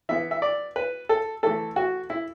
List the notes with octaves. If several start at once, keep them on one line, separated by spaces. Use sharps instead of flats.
E3 B3 E4 E5
E5
D5
B4
A4
E3 A3 E4 A4
F#4
E4